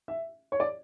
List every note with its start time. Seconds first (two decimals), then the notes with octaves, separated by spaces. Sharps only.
0.08 E5
0.52 C#5
0.60 D5